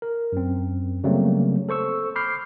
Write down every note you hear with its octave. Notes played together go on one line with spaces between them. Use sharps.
A#4
F#2 C4
C#3 F#3 G3 A3 A#3 C4
A4 C5 C#6 E6
B5 D6 F6 G6 C7